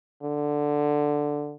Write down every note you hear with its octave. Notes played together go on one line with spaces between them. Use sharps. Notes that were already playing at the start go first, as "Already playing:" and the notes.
D3